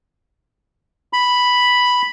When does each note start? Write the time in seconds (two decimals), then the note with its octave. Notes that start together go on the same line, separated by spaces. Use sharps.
1.13 B5